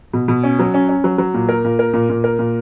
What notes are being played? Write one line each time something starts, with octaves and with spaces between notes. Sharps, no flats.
B2
B2
C#4
F#3
C#4
C#4
F#3
F#3
A#2
A#4
A#2
A#4
A#2
A#2
A#4
A#2